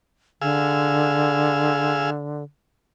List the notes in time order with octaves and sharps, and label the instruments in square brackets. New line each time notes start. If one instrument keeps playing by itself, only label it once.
[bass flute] D3 [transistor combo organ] G#4 F5 E6